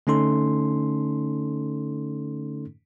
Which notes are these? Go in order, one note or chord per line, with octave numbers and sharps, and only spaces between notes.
D3 A3 C#4 D#4 A4 C6